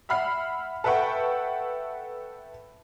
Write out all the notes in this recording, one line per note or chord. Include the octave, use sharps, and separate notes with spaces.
E5 F#5 B5 F6 C7
A4 B4 E5 F#5 G5 C#6